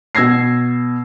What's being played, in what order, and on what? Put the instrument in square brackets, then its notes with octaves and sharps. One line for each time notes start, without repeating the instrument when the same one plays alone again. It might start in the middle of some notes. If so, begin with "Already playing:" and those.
[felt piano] B2 E6 G#6 A#6 C7